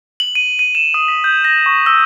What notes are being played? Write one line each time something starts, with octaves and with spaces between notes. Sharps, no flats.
F#7
D#7
D#7
E7
D#6
B6
G6
A#6
C#6
E6